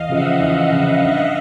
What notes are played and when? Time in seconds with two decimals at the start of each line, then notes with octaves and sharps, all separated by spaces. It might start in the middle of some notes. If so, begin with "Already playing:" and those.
Already playing: E2 D#5 F5
0.09 C#3 F3 E5 F#5
0.40 E2 D#5 F5
0.71 C#3 F3
1.01 G2